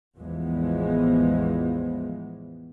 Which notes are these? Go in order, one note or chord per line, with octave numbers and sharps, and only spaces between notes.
A1 E2 E3 F3 G#3 B3